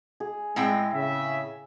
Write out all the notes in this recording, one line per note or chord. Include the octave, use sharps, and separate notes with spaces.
G#4
A2 G#3 C4 G5
C#3 E5